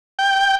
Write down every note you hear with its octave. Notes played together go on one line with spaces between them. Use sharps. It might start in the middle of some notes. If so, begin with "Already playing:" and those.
G5